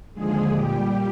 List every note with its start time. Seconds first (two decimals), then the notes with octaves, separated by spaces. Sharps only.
0.13 D#2 D3 F3 G#3 G#4
0.52 A#2 G3 G4